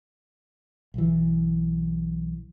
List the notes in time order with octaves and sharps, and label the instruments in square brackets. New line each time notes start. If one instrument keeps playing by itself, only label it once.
[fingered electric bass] B1 E3